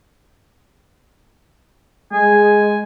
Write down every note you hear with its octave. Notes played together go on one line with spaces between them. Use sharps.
G#3 G#5